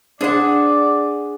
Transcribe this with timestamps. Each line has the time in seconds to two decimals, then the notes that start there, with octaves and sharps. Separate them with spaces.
0.21 D4 G#4 C5 D5 F#5